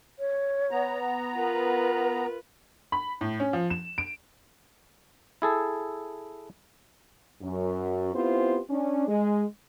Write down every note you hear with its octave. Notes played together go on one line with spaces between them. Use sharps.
C#5
B3 A#5
F4 A#4 B4
B5
A2
C#4
F3
E7
D7
E4 G#4 A4
F#2
B3 C4 E4 F4 G4 C5
C#4 D4
G#3